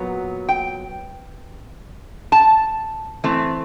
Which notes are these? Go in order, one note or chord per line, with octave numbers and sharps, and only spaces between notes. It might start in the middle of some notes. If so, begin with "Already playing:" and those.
Already playing: A#2 F#3 B3
G5
A5
E3 A3 C4